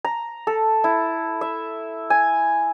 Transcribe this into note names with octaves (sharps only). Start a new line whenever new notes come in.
A#5
A4
E4
E5
G#5